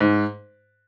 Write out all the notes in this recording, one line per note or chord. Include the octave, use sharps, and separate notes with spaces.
G#2